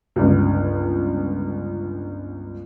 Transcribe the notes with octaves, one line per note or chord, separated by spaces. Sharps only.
G1 C#2